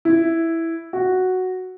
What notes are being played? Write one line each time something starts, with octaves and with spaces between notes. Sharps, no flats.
E4
F#4